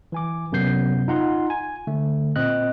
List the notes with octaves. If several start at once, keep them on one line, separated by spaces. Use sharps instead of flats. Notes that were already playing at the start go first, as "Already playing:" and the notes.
E3 G#5 D6
F#2 C3 B3 G6 C7
D#4 F4 F#5 A#5 C6
G#5
D3 A3
A#2 C4 D#5 F#6